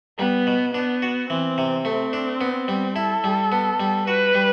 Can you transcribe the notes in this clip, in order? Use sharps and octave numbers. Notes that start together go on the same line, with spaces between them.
G3 B3
B2
B3 D4
F#4
E3 C4
C3
A3 C4
D4
B3
G3
E4 A4
G3
B3
G3
F#4 B4
G3